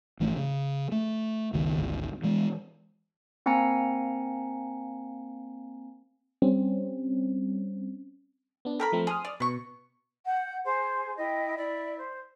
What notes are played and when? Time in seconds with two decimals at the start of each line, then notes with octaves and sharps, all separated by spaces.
0.20 G#1 E3 A3
0.36 C#3
0.92 A3
1.53 G1 C#2 D#3
1.78 G#1 D2
2.23 E3 G#3
3.46 A#3 C4 F5 G#5 A#5 C#7
6.42 G3 C4 C#4
8.65 B3 D4
8.80 G4 A4 A#4 A#5 B5
8.92 F3 A3 C4
9.07 G#4 C6 D#6 F6
9.25 D5
9.40 B2 B4 C#6
10.25 F#5 G6
10.64 G#4 C5 G#5
11.17 E4 D#5 G5
11.56 E4 D5 E5
11.97 C5